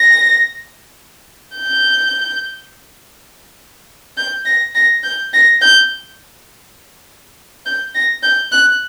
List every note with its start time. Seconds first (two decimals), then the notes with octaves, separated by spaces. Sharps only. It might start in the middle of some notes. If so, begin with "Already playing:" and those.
Already playing: A#6
1.56 G6
4.17 G6
4.45 A#6
4.75 A#6
5.04 G6
5.34 A#6
5.62 G6
7.66 G6
7.95 A#6
8.23 G6
8.52 F#6